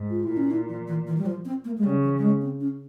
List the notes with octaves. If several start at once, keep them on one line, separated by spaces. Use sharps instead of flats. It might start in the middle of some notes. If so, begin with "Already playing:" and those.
Already playing: G#2
F4
E4
A#2
C#4
E4
F3
E3
E3
G3
F3
C4
A#3
G#3
C#3 G3
F3
G3
G#3
C4
C#4